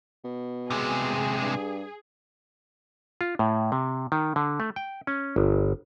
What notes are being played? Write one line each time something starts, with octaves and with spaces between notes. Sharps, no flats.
B2
C3 G#3 G#4
G2
F4
A2
C3
D#3
D3
A3
G5
C#4
G1